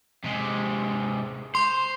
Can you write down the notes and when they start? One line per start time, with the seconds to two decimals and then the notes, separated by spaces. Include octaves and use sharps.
0.24 C3 G#3
1.55 C5 C6